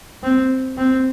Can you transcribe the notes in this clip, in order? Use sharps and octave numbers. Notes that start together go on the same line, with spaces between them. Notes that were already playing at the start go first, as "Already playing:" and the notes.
C4
C4